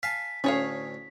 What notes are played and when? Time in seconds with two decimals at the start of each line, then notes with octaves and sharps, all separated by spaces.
0.03 F5 G#5 A5 B6
0.44 D2 A2 C#4 G#4 C#5 F5